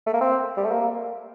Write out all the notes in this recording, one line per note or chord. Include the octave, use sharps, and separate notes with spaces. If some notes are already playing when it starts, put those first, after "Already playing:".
A3
A#3
C4
G3
A3
A#3